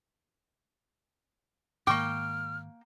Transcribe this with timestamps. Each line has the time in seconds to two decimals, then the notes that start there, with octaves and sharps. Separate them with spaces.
1.87 G#2 D#3 A#3 G5 C#6 D6 F6